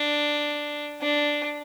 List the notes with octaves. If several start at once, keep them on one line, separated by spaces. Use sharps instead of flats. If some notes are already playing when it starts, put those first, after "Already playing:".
Already playing: D4
D4